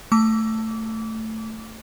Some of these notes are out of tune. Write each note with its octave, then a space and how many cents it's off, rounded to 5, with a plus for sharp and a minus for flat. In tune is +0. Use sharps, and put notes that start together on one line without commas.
A3 +10 D6 -30